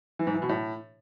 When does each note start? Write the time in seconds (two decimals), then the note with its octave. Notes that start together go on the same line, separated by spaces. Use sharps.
0.19 E3
0.27 G#2
0.34 E3
0.42 B2
0.49 A2